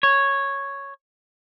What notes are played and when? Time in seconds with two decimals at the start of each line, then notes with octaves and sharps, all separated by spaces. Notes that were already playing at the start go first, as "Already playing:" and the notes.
0.03 C#5